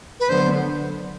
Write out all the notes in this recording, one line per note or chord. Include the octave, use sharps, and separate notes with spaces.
B4
D3 F#3 B3 C5